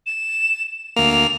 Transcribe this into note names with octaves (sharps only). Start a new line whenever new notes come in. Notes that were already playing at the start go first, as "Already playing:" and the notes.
E7
D2 A#3 F7